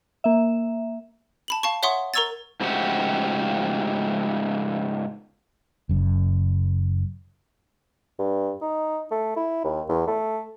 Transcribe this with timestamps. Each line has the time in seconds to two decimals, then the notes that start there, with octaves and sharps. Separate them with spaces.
0.24 A#3 E5
1.48 A5 B5 F#7
1.63 F5 A5 C#6
1.83 C#5 E5 F#5 C6 C#6 D#6
2.14 A#4 A#5 C#6 E6 G#6 A6
2.60 G#2 C#3 F3 A3 F#4 G4
5.89 F#1 F#2
8.19 G2
8.61 D#4
9.11 A3
9.36 E4
9.64 D#2
9.89 E2
10.07 A3